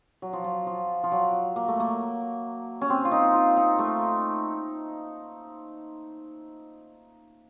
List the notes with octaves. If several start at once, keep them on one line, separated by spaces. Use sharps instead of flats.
F#3
F3
F#3
F3
F3
F#3
A#3
A3
A#3
C#4
C4
F4
D#4
F4
D#4
A3